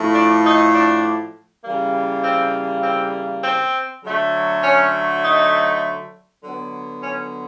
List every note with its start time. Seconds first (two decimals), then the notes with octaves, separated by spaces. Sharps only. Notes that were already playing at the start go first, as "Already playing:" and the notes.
Already playing: A2 F3 A3
0.14 D4
0.44 D#4
0.74 D4
1.63 C#3 E3 G3 A#3
2.24 C4
2.83 C4
3.44 C4
4.03 D3 F#3 A3
4.63 C#4
5.23 D#4
6.43 D3 F#3 B3
7.02 C#4